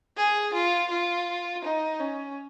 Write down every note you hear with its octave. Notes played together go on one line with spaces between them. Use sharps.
G#4
F4
F4
D#4
C#4